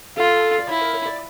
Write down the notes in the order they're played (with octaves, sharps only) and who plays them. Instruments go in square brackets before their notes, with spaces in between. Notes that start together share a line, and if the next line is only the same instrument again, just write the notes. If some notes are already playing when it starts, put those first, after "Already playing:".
[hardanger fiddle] F4 [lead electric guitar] A4
[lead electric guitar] D5
[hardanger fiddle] E4 [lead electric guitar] C#5
[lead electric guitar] A#4
C#5
D5